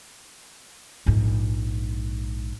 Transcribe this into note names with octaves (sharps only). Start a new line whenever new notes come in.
A#1 G#2